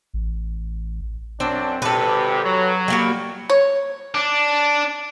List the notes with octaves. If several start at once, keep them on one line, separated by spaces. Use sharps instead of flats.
A1
F#2 C4 D4
G#1 C3 G4 A4 B4
F#3
G3 A#3 F#4
C#5
D4